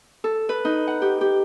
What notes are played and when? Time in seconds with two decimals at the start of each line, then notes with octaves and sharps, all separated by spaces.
0.24 A4
0.49 B4
0.65 D#4
0.88 F#5
1.02 G4
1.21 G4